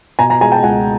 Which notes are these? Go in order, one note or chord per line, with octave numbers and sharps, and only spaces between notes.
B2 G#5 A#5
G#5 A#5
G#3 G#5 A#5
G5 A5
C#2 F#5 G#5